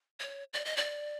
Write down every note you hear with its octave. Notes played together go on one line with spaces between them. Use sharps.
C#5
D5
D#5
D5